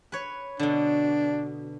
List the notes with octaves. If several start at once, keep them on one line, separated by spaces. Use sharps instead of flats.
B4 C#5
B2 D3 D4